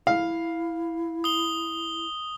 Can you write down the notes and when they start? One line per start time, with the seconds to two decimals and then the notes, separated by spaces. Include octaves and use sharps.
0.07 E4 F5
1.24 D#6 G7